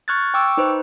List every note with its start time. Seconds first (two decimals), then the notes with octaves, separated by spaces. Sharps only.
0.08 C#6 F6 F#6 G#6 A6
0.34 G5 C#6 D6 E6
0.57 D#4 B4 C5